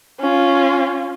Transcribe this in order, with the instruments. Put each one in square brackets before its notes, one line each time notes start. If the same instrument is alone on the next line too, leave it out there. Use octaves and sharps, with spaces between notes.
[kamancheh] C#4 F4